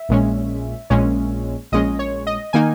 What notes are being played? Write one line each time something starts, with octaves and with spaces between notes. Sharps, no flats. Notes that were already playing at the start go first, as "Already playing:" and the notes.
Already playing: E5
A#1 A#2 G#3 C#4
A#1 A#2 G#3 C#4
A#1 A#2 G#3 C#4 D#5
C#5
D#5
D#3 A#3 D#4 G#5